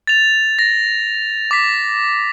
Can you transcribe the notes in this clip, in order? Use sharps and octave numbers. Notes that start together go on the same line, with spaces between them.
A6 F7
A#6
D6 B6